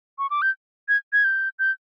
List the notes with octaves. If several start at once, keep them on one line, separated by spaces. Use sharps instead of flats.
C#6
D6
G6
G#6
G#6
G6
G6